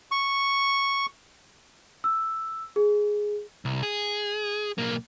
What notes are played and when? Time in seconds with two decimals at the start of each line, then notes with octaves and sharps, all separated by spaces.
0.11 C#6
2.04 E6
2.76 G#4
3.65 C2
3.83 G#4
4.78 B1 A#3